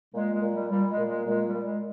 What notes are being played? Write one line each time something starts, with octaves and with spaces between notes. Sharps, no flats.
A#2 G#3
G#3
A#2
G3
A#2 G3
G#3
A#2
G#3
A#2 G#3
G3
A#2
G#3